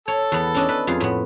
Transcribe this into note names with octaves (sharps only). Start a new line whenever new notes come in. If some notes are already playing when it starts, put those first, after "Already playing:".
A4 C#5
E2 B3
C#4 D4 D#5
B4
F2 F4 G#4
A2 B3